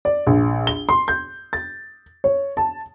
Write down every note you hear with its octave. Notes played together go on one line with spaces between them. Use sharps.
D5
A#1
G7
C6
G6
A6
C#5
A5